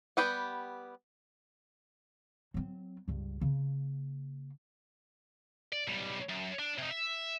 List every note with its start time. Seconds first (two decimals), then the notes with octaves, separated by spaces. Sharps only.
0.17 G3 B3 G4 B4 F#5
2.54 F#3 C4
3.08 C#2 G2
3.41 C#3 A#3
5.72 D5
5.87 B1 G3
6.29 F#2
6.59 D4
6.78 C3 D#4
6.90 E5